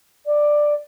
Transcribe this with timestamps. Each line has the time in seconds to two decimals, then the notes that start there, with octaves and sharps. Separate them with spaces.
0.26 D5